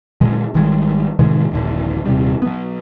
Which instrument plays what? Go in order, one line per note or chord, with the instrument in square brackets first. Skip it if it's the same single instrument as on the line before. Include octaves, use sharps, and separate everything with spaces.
[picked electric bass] A#2 D3 F#3 G#3
G#1 D#3 G3 G#3
A2 C3 D#3 G#3
D#1 A#1 D3
D#1 C3 G3
F#3 B3